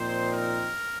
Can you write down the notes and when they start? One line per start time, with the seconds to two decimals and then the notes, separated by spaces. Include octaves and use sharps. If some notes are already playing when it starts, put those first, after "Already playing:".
Already playing: A#2 F3 C4 D#4 C5
0.32 A#4